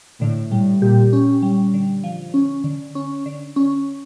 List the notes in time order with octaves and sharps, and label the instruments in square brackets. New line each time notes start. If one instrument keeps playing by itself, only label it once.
[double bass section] A2 [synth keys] D3
[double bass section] A2 [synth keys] G3
[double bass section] A#2 [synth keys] G4
[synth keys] C#4
G3
D3
F3
C#4
D3
C#4
D3
C#4